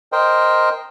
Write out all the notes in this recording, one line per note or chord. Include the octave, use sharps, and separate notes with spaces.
A#4 C5 D#5 G5